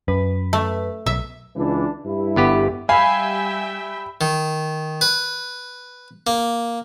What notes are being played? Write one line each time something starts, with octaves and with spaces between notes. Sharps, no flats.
F#2 B4
A3
B1 E5
C#2 E3 D4
G2 E4
G1 B3 G4
G3 E5 F5 G5 G#5 B5
D#3
B4
A#3